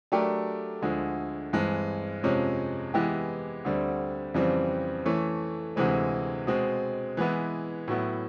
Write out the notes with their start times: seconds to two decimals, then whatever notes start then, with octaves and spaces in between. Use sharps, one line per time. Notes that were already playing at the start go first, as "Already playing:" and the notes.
0.12 F#3 A3 D4 G4 A#4
0.82 D2 D3 F3 G#3
1.53 G2 E3 G#3 C4
2.23 F2 C3 F3 G#3 C#4
2.94 E3 G#3 B3 E4 G4
3.65 D2 D3 G3 C4
4.34 F2 C#3 E3 G3 C4
5.06 E3 A3 C#4
5.76 D2 C3 E3 G#3 C4
6.47 B2 G#3 C4
7.17 E3 G#3 B3 E4
7.88 A2 F#3 B3 E4